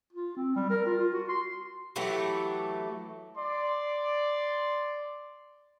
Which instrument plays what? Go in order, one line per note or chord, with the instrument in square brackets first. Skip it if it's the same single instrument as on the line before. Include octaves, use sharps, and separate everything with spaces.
[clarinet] F4
C4
G3
A#4
F4
F4
F#4
C6
[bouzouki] E3 F#3 A3 G4
[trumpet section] D5 C6